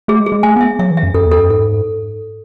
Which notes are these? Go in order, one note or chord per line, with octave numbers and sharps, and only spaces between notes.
A3 G#4
G#3
G#4
G#3
A3 G#5
B3 E5
F#3 E5
E3
E5
F#2
F#2 A4
E2
A4
F#2
G#2 A4